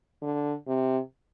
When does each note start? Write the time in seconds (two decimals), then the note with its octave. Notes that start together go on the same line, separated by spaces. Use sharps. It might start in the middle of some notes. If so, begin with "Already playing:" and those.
0.22 D3
0.67 C3